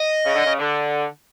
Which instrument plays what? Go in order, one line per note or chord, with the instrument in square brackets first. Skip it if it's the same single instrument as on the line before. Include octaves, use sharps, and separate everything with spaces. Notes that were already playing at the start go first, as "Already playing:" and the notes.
Already playing: [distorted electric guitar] D#5
[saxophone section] C#3
D3
C#3
D3